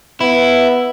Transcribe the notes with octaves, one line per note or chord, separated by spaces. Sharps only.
B3 E4